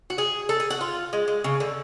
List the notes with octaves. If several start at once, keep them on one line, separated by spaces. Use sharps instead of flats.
F#4
G#4
A4
G#4
F#4
F4
G#3
G#3
C#3
D3